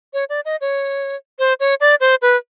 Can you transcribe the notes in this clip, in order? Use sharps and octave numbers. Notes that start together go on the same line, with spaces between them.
C#5
D5
D#5
C#5
C5
C#5
D5
C5
B4